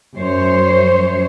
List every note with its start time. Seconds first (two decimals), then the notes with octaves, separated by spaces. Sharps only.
0.16 F#2 C5 C#5